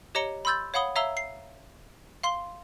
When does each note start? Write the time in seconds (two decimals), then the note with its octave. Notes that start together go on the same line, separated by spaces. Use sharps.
0.15 G4 C#5 D#5 A#5 C#7 G7
0.45 B5 C6 E6 G6 A6
0.74 C#5 F5 F#5 B5 D#6 G7
0.96 C#5 E5 F5 A#5 E6 G7
1.17 C7
2.23 F5 C6 G7